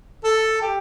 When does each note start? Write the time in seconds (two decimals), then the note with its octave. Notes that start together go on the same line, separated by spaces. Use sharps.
0.24 A4
0.62 G4